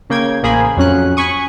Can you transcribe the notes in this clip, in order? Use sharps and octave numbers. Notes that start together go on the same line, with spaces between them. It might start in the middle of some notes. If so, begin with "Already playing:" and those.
C#3 A#3 G5 G#6
A1 A#3 G#4 C5 B5
F2 F#3 C#4 F#6
G#5 B5 C#6 D#6